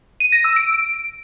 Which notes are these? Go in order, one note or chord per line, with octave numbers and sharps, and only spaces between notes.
D#7
A#6
E6
D7